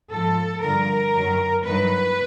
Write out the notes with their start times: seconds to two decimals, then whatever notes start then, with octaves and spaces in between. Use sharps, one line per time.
0.10 G#2 F3 A4
0.62 G2 D3 F3 A#4
1.13 F#2 D#3 F#3
1.65 G2 D#3 F#3 B4